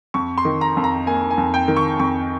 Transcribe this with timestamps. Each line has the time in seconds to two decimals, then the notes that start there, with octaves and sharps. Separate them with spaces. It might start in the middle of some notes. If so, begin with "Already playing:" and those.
0.14 F2 C#6
0.38 C6
0.45 D#3
0.61 A#5
0.77 F2
0.84 A#5
1.06 A#3 G#5
1.31 G#5
1.38 F2
1.54 G5
1.68 D#3
1.76 C#6
1.99 F2 C#6